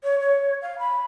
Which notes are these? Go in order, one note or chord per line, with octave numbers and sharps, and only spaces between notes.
C#5
C#5
F5
B5